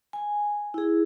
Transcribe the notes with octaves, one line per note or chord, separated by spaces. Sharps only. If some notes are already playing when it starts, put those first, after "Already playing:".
G#5
E4 G#4